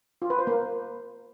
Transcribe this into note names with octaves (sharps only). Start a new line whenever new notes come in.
F4
B4
C5
A#3